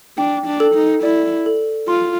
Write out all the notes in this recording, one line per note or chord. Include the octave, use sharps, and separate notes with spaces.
D4 G5
D4
A4
D#4
E4 D5
A4
F4 C6